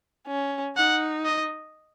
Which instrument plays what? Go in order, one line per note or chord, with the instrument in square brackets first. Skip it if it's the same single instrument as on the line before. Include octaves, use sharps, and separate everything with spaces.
[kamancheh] C#4
[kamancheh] D#4 [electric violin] F#5
[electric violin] D#5